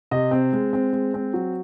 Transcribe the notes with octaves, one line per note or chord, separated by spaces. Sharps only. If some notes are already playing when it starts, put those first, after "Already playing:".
C3 D#5
C4
G#3
C4
G#3
C4
F#3